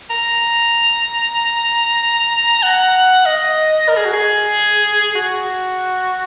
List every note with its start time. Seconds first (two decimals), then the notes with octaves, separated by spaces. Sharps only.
0.10 A#5
2.63 F#5
3.26 D#5
3.88 A#4
3.97 G#4
4.05 F#4
4.13 G#4
5.15 F#4